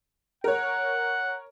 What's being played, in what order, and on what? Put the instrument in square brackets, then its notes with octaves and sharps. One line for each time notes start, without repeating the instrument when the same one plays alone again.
[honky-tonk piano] A#4 C#5 [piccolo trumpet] F#5